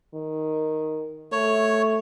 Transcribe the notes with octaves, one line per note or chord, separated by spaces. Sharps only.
D#3
A3 C#5